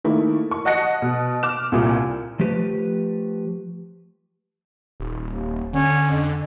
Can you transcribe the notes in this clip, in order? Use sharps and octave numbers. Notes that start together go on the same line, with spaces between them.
D#3 A3 A#3 E4
C#6
D#5 F#5 A5 F#6 A#6 C#7
B2
D6 F6 E7
C2 A#2
F3 A3 G4 B4
D#1
D#2
D3 C#4
F2